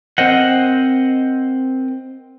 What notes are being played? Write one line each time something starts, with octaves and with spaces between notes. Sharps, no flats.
C4 A#4 C5 D#5 F#5